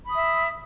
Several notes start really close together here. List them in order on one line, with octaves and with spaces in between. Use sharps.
B5 D#6 E5